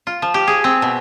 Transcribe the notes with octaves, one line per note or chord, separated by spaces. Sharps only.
F4
F3
G4
G#4
C4
B2